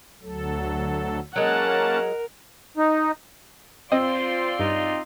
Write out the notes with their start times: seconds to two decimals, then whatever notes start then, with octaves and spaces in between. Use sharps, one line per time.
0.22 D2 F#3 A4
1.36 F#3 G#3 A#3 C#4 A#4 F#5 A5
2.78 D#4
3.92 C4 F4 C5 D5 D#5 C6
4.59 G2 D#4